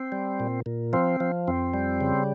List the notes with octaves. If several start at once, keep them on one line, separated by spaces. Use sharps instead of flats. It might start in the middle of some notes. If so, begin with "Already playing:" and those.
Already playing: C4
G3
A#2
A#2
F3 C4
F3
F2 C4
G3
C#3